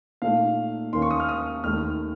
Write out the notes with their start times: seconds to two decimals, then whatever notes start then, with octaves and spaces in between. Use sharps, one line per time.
0.22 A#2 A3 D#4 F5
0.93 D#2 D#3 A#3 C#4 C6
1.02 C#6
1.11 D#6
1.20 F6
1.29 D#6
1.64 D#2 D#3 A3 D#4 F6